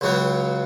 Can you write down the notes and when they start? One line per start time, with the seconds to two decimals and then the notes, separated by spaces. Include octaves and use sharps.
0.01 C#2 C#3 F#3 B3